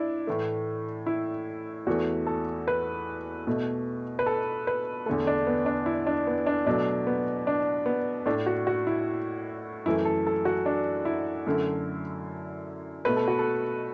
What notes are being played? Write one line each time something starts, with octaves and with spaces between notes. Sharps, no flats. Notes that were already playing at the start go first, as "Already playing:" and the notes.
Already playing: D4 E4
A2 E3 A3
E4
E2 E3 A3 F#4
A4
B4
B2 A3
B4
A4
B4
E2 D3 A3 A4
D4
B3
D4
E4
D4
B3
D4
B2 F#3 A3 D4
B3
D4
B3
A2 A3 D4
F#4
F#4
E4
F#2 E3 A3 E4
A4
A4
F#4
D4
E4
F#2 D3 A3
B2 A3 B4
A4
F#4
A4